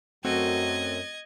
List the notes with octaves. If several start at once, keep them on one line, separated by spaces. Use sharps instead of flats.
F#2 F#3 A3 C4 F#4 D#5 G#6